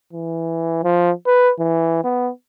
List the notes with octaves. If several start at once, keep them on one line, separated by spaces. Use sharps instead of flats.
E3
F3
B4
E3
B3